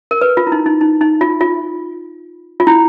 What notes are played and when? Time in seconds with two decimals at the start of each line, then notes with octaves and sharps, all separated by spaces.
0.11 A#4
0.21 B4
0.37 F4
0.47 E4
0.52 D#4
0.66 D#4
0.81 D#4
1.01 D#4
1.21 F4
1.41 F4
2.60 F4
2.67 E4